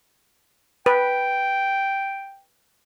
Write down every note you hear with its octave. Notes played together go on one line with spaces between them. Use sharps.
B4 G5